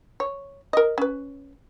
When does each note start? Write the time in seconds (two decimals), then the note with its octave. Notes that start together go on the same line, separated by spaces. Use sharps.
0.20 C#5
0.73 A#4 D#5
0.98 C#4 B4